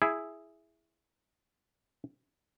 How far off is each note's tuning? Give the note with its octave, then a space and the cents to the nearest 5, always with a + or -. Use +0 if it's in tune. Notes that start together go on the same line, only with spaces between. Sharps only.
E4 +0 G#4 +0